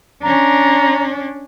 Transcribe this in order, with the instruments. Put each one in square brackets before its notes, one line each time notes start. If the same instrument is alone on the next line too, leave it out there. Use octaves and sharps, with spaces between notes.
[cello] C#4 D4 [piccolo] A#5